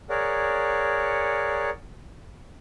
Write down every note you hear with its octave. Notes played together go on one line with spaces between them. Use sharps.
G#4 A#4 C#5 D5 F#5